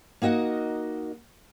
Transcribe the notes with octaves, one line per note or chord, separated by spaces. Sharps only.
A#3 D#4 F#4 D#5 F#5